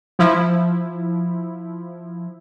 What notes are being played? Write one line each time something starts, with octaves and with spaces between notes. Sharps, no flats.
F3 E4